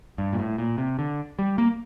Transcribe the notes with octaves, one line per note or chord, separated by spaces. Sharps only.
G2
A#2
A2
A#2
C3
D3
G3
A#3